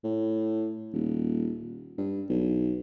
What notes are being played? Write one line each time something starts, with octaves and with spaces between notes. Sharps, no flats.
A2
D#1
G2
B1